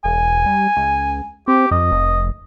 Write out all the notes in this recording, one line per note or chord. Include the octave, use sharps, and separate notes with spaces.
E1 G#5
G3
C#2
C4 G4
F2 D#5
F1